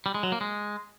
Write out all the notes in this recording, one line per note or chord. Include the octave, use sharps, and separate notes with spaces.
G3
G#3
F#3
A#3
G#3